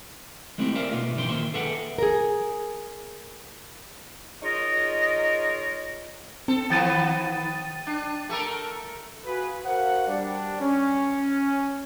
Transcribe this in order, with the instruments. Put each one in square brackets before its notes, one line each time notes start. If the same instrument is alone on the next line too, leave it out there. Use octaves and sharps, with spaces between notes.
[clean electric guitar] G#3 A3 C4 D#4 E4 G4
A#4 C5 D5 E5 F5
B2 A#3 B3 D#4 F4
B1 G2 E3 G3 G5 C6
A#2 D#3 A#3 C5 E5 C6
G#4 A4 B4 E5 F#5 G5
[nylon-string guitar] G#4 A#4
[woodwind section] D#4 F4 G#4 A#4 C#5 D#5
[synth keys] C4 [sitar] A4
[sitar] D#3 F3 B3 [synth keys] G5 A6 D#7
[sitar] D4
A3 A4 A#4
[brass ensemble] F4 F#4 G#4 B4
F#4 A#4 C5 F5 F#5
G3 D4
C#4